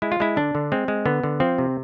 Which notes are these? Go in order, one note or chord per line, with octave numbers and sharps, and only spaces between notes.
G#3 E4
F4
G#3 E4
D3 D4
D3
G#3 C4
G#3
D3 B3
D3
F3 C4
C3